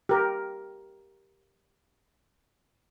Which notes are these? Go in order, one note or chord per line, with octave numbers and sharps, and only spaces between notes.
G4 A#4